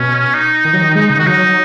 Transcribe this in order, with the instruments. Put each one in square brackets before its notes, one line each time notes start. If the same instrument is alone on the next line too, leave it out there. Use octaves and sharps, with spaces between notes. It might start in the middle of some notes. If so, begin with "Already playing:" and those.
Already playing: [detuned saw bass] B2 [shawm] C#4
[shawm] D#4
[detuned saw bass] D#3
F#3
D#3
G#3
C#3
[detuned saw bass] D#3 [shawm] F#4
[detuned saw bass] F#3 [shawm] D#4
[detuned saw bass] F#3